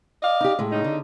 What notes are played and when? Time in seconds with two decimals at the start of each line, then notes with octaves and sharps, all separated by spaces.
0.22 D5 D#5 F5
0.41 D#4 G4
0.59 A2 G#3
0.72 C#3 D#4
0.84 D3